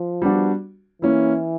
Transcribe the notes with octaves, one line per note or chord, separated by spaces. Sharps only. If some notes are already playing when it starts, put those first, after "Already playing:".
Already playing: F3
G3 B3 D4 F#4
E3 A#3 C#4 E4